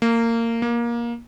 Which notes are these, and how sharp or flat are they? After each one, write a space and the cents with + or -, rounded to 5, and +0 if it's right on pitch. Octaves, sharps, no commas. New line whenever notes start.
A#3 -20
A#3 +20